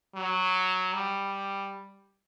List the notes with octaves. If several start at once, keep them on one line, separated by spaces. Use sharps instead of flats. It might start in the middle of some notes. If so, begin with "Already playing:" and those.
F#3
G3